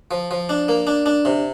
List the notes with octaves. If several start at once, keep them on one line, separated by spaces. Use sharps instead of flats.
F3
F3
D4
A#3
D4
D4
C3